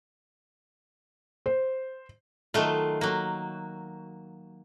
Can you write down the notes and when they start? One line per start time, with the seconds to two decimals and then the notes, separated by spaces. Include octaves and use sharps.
1.46 C5
2.54 D#3 F#3 A3 F4
3.01 F#3 A#3